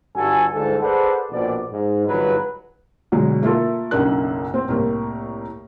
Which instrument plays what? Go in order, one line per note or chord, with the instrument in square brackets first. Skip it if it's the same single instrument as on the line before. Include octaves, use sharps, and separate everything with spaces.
[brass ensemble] G1 G2 F#4 A4 G#5
G1 D2 G#2 A4
G#4 A4 B4 C5 D5 F#5
A#1 B2 D5
G#2
G1 G#2 E3 F#3 B4
[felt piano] B2 D3 F#3 G#3
A3 A#3 E4 F4 A4
F#1 B1 F#2 D4 A#4 F#6
C4
C2 A2 A#3